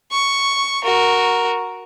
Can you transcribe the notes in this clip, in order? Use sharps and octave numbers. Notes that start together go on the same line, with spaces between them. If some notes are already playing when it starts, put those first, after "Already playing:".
C#6
F#4 A#4